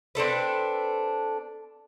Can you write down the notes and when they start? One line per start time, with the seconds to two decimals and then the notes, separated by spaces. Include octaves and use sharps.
0.15 C4 D4 A4 B4